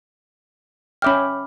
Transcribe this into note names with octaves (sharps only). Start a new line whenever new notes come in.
C#4 E5 G5 B5 D6 F6